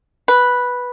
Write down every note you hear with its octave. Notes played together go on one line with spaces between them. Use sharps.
B4